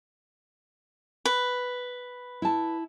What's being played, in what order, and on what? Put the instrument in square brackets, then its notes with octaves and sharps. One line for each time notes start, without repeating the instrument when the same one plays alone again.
[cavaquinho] B4
[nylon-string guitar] E4 A5